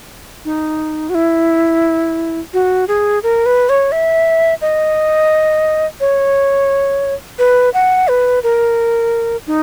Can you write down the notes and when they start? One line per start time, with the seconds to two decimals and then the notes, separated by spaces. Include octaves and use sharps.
0.45 D#4
1.10 F#4
1.15 E4
2.54 F#4
2.88 G#4
3.23 A#4
3.46 B4
3.69 C#5
3.92 E5
4.61 D#5
6.00 C#5
7.39 B4
7.74 F#5
8.08 B4
8.43 A#4
9.47 D#4